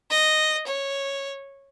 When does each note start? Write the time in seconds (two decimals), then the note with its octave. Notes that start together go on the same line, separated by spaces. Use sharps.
0.10 D#5
0.67 C#5